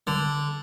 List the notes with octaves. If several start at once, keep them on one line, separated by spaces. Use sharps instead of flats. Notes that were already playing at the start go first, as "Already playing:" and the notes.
D3